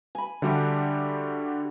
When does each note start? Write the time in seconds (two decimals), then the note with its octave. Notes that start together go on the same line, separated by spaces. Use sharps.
0.15 G#5 B5
0.42 D3 G3 D4 F#4 G4 E5